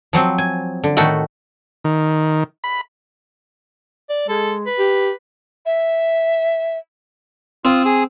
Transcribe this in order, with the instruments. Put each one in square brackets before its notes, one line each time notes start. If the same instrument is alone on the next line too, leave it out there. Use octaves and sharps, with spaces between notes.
[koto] F3 F#3 C4
G#5
D3
A2 D#3 A3 F#4 G5
[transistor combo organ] D#3
B5
[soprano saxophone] D5
[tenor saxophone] G#3 [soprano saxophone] A4
[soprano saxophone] B4
[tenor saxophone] G4
[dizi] E5
[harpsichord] C4 [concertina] F4 D#6
[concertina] G#4 D#6